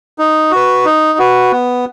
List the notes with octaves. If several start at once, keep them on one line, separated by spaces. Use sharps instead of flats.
D#4
F#4 B4
D#4
F#4 B4
B3